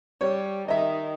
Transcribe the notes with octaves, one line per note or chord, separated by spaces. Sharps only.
G3 C#5
D#3 D#5 E5